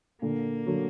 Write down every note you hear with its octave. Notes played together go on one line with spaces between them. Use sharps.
A#2 D3 A#3
D3 F#3